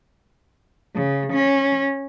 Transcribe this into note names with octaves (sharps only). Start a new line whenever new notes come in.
C#3
C#4